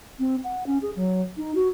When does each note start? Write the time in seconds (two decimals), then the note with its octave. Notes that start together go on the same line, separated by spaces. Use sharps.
0.19 C4
0.44 F#5
0.67 C#4
0.82 G#4
0.96 F#3
1.37 D#4
1.55 F#4